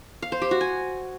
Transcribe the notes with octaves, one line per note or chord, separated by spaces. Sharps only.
F5
C5
G4
F#4
G#5